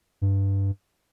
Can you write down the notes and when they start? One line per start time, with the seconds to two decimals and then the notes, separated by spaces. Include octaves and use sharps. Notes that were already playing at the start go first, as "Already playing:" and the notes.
0.22 G2